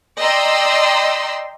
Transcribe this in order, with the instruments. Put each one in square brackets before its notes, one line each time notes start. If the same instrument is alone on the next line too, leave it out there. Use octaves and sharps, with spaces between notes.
[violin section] D5 D#5 G5 A#5 C6 E6